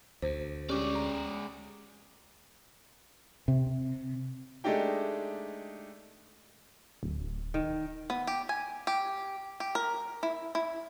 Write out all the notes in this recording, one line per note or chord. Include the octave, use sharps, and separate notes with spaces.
D2 C5
G#3 C#4 G4 D5 D6
A#5
C3
G#3 A3 D4 D#4 G4 G5
D1
D#3
B3
G4
G#5
G4
G4
A#4
E4
E4